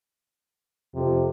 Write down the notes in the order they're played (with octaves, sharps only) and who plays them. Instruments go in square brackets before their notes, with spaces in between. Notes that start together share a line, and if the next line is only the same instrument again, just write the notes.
[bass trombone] F2 [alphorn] C3